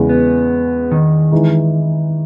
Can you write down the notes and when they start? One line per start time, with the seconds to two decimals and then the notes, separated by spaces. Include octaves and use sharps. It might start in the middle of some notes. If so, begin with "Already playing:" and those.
Already playing: E2 C#3 G#3
0.09 B3
0.91 D#3
1.32 E3 G#3 D#4